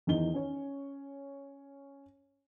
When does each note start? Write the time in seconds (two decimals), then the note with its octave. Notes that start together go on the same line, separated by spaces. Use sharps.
0.07 E2 D#3 D#4 G7
0.34 C#4 C#5